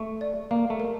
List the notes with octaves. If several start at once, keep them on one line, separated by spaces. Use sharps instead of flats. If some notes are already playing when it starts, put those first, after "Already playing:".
Already playing: A3 C#6
D5
A#3 F5
A3
A#4